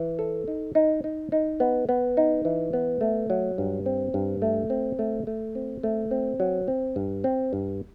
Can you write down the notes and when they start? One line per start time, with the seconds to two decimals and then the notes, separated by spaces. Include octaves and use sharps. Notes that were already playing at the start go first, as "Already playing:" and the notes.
Already playing: E3
0.19 A4
0.48 D#4
0.75 D#4
1.04 D#4
1.32 D#4
1.60 B3
1.89 B3
2.17 D#4
2.45 E3
2.73 B3
3.01 A3
3.30 F#3
3.58 G2
3.86 C4
4.14 G2
4.42 A3
4.70 C4
4.99 A3
5.27 A3
5.55 C4
5.83 A3
6.11 C4
6.40 F#3
6.68 C4
6.96 G2
7.24 C4
7.53 G2